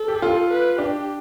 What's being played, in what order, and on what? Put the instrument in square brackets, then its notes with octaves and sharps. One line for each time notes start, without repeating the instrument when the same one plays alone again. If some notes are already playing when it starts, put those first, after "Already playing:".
Already playing: [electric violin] A4
[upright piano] G4
F4
[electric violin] B4
[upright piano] D4 [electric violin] G4